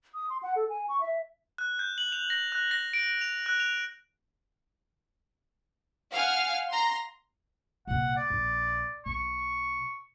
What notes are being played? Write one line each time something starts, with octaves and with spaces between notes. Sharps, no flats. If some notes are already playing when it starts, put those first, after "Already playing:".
D#6
C6
F#5
A4
G#5
C#6
E5
F#6
G6
F#7
F7
A#6
F#6
A#6
D7
F7
F#6
F7
F5 F#5 G#5 F6
A#5 C6
C2 A#2 F#5
D5
A#1
B1 C#6